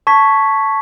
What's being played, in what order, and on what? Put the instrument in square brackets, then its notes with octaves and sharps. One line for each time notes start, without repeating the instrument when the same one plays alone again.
[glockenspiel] A5 C#6 G#6 B6